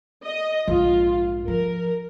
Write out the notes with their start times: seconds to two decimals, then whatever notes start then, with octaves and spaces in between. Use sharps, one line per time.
0.23 D#5
0.68 A#1 G#2 F4
1.48 F3 A#4